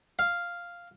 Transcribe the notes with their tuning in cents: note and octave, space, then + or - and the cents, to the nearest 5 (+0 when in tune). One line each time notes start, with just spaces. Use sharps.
F5 +0